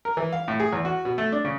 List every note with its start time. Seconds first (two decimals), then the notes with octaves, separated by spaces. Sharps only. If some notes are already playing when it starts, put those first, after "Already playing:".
0.05 A#4
0.17 E3
0.32 F5
0.48 A2
0.60 G#4
0.73 E2
0.85 F#4
1.05 B2
1.18 A3
1.32 D4
1.45 C#3